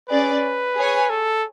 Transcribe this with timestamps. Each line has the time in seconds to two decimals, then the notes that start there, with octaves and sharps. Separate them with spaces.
0.09 C#4 G#4 B4 D5
0.76 G#4 C#5 G#5
1.10 A4